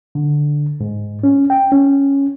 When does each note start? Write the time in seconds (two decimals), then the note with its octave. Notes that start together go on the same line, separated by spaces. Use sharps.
0.15 D3
0.80 G#2
1.23 C#4
1.50 G5
1.72 C#4